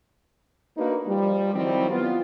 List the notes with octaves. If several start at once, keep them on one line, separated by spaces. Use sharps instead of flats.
A#3 D4 D#4 F#4 B4
F3 G3
D#3 F#3 G3 C4 E4
B3 F4